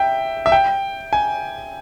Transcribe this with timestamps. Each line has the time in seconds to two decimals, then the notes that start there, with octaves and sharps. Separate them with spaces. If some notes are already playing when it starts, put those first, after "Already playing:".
Already playing: E5 G5
0.46 E5
0.52 G5
1.13 G#5